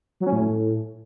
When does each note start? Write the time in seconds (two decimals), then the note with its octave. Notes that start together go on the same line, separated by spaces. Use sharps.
0.20 F#3
0.27 C#4
0.33 A2